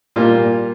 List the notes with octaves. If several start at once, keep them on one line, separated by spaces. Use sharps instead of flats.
A#2 G3 A#3 F4